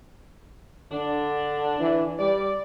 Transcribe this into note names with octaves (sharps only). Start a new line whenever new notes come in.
D3 D4
E3
G3 D5